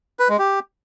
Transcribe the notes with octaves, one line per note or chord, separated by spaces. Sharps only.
B4
G#3
G4